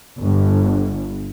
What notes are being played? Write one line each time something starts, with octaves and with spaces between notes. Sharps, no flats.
G1